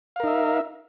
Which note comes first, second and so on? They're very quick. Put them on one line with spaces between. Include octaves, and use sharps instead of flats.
F5 A#4 D#4 E5